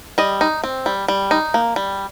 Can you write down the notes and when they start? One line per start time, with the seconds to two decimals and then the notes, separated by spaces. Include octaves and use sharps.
0.18 G3 D#5
0.41 D#4
0.64 C4
0.86 G3
1.08 G3
1.31 D#4
1.54 A#3
1.76 G3